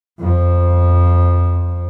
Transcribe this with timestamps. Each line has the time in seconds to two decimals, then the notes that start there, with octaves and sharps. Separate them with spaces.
0.19 F2 F3